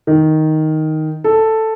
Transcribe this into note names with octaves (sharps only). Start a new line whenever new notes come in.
D#3
A4